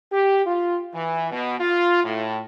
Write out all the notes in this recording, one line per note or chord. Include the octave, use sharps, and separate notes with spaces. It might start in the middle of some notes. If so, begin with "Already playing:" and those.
G4
F4
E3
B2
F4
A2